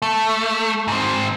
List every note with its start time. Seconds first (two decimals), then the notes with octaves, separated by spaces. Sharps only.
0.02 A3
0.88 G#2 C4